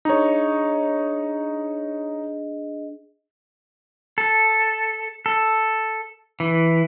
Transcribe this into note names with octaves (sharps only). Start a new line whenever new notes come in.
D4 D#4 G#4 C#5 D#5
A4
A4
E3